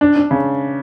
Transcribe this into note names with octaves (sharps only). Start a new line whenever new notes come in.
D4
D4
C#3